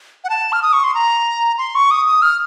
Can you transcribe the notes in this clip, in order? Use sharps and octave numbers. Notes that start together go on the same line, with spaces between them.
F#5
A5
F6
D#6
C#6
C6
A#5
C6
C#6
D#6
D#6
F6